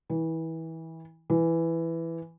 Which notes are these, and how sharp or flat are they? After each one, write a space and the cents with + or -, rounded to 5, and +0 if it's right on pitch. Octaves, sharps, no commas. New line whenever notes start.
E3 -25
E3 +5